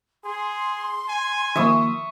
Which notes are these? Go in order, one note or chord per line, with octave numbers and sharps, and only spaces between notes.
G#4 C6
G#5
D#3 F3 A#3 E5 C#6 D#6